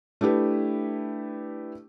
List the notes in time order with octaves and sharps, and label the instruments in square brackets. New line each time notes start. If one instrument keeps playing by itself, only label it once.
[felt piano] A3 D4 E4 G4 B4